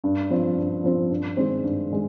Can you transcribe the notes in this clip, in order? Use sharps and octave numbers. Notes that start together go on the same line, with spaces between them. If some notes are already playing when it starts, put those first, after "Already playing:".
G2
F3 C4
G2
F3 C4
G2
D#3 G#3 C4
G2
D#3 G#3